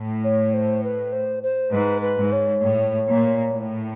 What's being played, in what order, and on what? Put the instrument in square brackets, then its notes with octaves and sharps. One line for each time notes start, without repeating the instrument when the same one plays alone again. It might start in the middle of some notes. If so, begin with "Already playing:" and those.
Already playing: [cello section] A2
[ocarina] C#5
C5
B4
C5
C5
[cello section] G#2 [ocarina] B4
[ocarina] B4
[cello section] G#2
[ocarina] C#5
[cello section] A2
A#2
A2